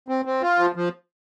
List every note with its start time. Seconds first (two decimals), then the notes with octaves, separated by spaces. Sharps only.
0.08 C4
0.25 C4
0.42 F4
0.58 F3
0.76 F3